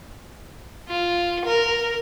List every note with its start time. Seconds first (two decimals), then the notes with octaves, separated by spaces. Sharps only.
0.88 F4
1.44 A#4